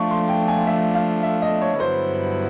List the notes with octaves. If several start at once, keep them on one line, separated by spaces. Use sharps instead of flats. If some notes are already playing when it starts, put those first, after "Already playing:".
Already playing: F3 A3 D4 F4 C#6
C6
G5
G#5
E5
F5
E5
D#5
C#5
G2 D3 F#3 B3 E4 C5